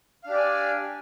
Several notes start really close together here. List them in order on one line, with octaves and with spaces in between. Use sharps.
F5 D4 G4 D5 G#5